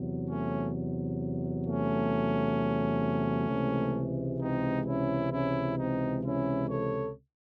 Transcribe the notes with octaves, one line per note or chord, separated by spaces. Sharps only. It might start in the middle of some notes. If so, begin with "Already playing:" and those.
Already playing: E2 C3 F#3
A3 C#4
A3 C#4
C#2 C3 E3 G#3
C4 D#4
C#4 E4
C#4 E4
C4 D#4
C#4 E4
A4 C#5